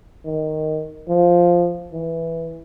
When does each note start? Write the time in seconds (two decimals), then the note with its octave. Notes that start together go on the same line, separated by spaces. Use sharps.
0.25 D#3
1.08 F3
1.93 E3